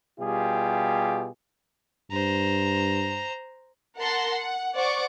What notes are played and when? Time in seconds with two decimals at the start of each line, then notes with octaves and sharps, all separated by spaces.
0.20 B2 G3 F4 G4 G#4
2.11 G2 C5 A#5
3.98 A#4 F#5 A5 C6 A#6
4.32 F#5
4.76 C5 D5 F#5 C#6 D6